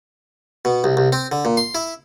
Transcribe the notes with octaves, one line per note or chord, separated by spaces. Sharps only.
B2
C2
C2
C4
D3
A#2
C6
E4